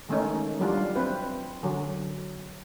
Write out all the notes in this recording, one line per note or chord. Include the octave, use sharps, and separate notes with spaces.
D#3 G#3 A3 C#4 D#4
F#3 G3 D4 F4
C4 B4
D3 F#3